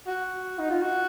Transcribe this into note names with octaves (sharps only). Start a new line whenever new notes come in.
F#4
D#4
F4
F#4